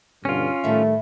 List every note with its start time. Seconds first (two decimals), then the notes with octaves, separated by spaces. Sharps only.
0.25 G2 B2 D3 C#4 F4
0.64 A2 D#3 G3 A3 E5